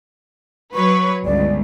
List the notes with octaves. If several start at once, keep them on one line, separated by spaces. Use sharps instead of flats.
F#3 B4 C#5 C#6
G1 C#2 D5